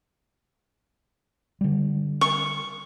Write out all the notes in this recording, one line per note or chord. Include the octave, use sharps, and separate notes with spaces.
D3 G3
C#6